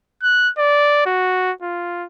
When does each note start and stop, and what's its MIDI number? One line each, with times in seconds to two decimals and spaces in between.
0.23 0.50 90
0.58 1.01 74
1.06 1.52 66
1.62 2.05 65